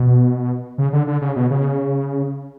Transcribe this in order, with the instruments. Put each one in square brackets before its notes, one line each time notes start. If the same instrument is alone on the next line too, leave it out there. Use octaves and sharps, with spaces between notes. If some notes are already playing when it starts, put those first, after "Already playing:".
Already playing: [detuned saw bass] B2
C#3
D3
D3
C#3
B2
C#3